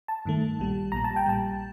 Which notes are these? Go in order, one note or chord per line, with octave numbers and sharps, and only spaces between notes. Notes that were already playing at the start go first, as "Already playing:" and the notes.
A5
G2 D#3 A3
A#1 A#2 G3
A#1 A#2 G3 A#5
A5
G5
A#1 A#2 G3 A5